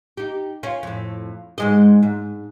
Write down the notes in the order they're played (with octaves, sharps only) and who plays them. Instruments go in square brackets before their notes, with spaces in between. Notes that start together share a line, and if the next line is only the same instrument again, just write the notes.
[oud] D#4 G4
C#4 F4
F2 A2
G#2 G#3 D#5
G#2